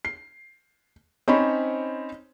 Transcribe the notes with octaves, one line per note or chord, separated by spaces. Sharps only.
C7
C4 C#4 D#4 C5 C#5 B5